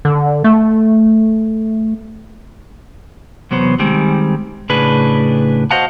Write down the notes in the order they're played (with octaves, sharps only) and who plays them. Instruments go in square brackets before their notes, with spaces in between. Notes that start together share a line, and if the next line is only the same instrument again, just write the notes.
[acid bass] D3
A3
[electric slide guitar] E2 C3 F#3 B3 C5
D#3 G3 G#3 C4
A2 C#3 D4 G#4 B4
F#4 C5 D#5 F5 F#5 A5